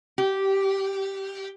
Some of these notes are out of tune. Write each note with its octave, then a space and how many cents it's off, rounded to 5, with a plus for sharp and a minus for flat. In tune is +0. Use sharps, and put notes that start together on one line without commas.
G4 -10